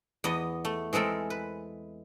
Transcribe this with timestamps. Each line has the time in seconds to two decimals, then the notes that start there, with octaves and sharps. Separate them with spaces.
0.24 E2 B3 D#5
0.65 A3
0.93 E3 G#3 C4 A4 A#4
1.30 B4